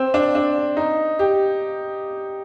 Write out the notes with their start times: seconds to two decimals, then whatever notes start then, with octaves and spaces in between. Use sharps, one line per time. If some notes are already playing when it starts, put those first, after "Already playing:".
Already playing: C4
0.14 D4
0.35 D4
0.77 D#4
1.19 G4